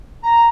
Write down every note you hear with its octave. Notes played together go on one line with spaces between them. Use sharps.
A#5